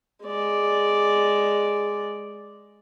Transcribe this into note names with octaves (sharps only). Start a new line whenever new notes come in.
G#3 D5